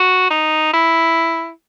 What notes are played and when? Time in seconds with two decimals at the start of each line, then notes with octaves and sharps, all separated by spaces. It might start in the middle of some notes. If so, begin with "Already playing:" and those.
Already playing: F#4
0.31 D#4
0.74 E4